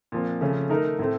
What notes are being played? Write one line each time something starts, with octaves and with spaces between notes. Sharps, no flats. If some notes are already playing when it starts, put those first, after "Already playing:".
A#2 F3 C4
C#3 F3 A3 C#4
D#3 A3 D#4 A#4
A2 A3 C4